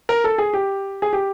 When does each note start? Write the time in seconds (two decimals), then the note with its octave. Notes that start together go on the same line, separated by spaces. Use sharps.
0.09 A#4
0.24 A4
0.38 G#4
0.53 G4
1.02 G#4
1.13 G4